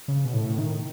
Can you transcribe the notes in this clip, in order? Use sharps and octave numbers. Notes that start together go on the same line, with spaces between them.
C#3
B2
A2
D#3